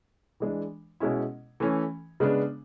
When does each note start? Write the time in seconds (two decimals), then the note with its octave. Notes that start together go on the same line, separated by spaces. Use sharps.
0.40 E3 G#3 D4
1.00 B2 G#3 C#4 E4
1.60 E3 A3 C#4
2.20 C#3 G#3 B3 D4